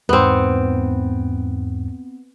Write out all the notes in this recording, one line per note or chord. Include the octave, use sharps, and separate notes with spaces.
E2 G#2 B3 C4